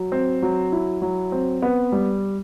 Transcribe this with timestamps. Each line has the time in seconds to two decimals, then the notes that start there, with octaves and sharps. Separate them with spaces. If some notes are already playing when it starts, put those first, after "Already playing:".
Already playing: F#3
0.12 C4
0.42 F#3
0.72 E4
1.02 F#3
1.32 C4
1.62 B3
1.92 G3